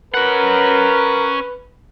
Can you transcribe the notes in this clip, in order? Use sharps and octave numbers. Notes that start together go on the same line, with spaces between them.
C#4 A#4 B4 F#5